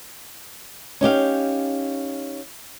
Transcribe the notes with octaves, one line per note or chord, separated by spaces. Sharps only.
C#4 D#4 G4 F5